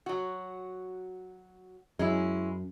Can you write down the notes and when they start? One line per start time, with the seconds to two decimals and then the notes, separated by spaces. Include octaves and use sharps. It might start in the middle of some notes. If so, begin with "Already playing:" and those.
0.06 F#3 F#4
1.99 F#2 G#3 C#4 E4